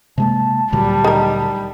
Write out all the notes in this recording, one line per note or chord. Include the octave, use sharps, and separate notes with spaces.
C3 G#3 A#3 A5
D2 A#2 F#3 G3
D#3 A#4